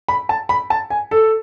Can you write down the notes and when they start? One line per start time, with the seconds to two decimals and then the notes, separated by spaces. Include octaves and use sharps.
0.08 B5
0.29 A5
0.49 B5
0.70 A5
0.90 G#5
1.11 A4